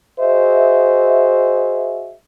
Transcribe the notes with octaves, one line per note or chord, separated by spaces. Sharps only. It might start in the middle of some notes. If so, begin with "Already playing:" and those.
F#4 G#4 C5 D#5 E5